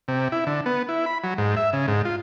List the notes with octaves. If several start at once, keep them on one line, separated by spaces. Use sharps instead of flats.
C3
E4
D3
B3
E4
B5
F#3
G#2
E5
C#3
G#2
F4